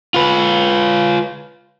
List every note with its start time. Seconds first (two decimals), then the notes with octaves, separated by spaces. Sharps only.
0.14 F4 B4